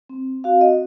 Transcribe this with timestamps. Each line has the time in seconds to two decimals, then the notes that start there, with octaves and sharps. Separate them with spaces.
0.09 C4
0.44 F#4 F5
0.61 D#5